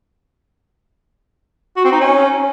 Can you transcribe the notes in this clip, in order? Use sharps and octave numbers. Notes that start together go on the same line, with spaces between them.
F#4
C4
D#4
C#4